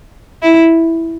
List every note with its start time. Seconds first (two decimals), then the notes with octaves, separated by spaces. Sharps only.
0.42 E4